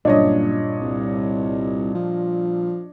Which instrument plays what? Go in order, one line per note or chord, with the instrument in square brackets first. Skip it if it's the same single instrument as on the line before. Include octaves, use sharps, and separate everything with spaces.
[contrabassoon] F#1 [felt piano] G2 A#2 [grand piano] D4 C#5 D#5
[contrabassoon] C2
F3